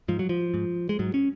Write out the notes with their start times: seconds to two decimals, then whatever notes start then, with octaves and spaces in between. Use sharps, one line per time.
0.08 G#2 F3
0.19 F#3
0.29 F3
0.54 G#2
0.89 G#3
0.99 G#2 F#3
1.14 C#4